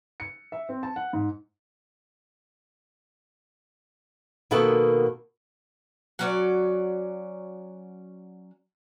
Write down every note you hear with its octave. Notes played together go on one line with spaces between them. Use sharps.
C#7
E5
C4
A5
F#5
G#2
B2 D#3 A#3 B3 F#4 A4
F#3 C#4 D5